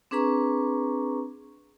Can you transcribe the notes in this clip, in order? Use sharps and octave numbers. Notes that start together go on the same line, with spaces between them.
C4 D4 G#4 B4 A#5 C#6